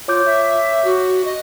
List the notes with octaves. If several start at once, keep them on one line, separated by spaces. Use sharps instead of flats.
F4 C#5 D6 G6
E5
F#4
D#5